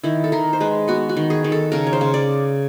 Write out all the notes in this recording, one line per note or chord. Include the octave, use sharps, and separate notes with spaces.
D#3 E4
A4
D#3 A#4
C5
G#3 B4
B3 F#4
F#4
D#3
G#4
D#3
A4
C#3 A#4
C#5
C5
C#3
D5